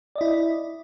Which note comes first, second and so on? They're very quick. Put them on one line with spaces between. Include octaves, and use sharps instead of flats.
D5 D#5 E4